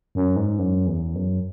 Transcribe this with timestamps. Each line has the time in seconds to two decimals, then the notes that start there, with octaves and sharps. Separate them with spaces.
0.15 F#2
0.36 G#2
0.59 F#2
0.87 E2
1.15 F#2